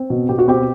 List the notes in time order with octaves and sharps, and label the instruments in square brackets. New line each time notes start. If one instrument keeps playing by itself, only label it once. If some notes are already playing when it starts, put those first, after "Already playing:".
Already playing: [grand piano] C4
B2
B2 G4
F#4
C4 G4